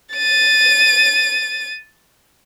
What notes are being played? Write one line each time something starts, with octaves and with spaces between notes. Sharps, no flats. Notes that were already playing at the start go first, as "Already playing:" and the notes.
A6 D#7